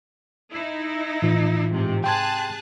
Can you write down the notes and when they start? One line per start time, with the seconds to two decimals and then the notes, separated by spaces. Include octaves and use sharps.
0.51 D#4 E4
1.22 A2 E3 F4
1.72 G#2 C3
2.04 G#4 G5 A5 C6 F#6 G#6